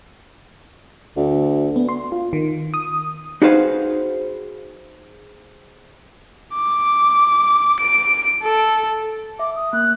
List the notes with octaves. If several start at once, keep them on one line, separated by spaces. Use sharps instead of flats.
D2
B3
C6
F4
D#3
D#6
D#4 F#4 G#4 B4 C5 F5
D6
D7
A4
E5 D6
D#6
A#3 F#6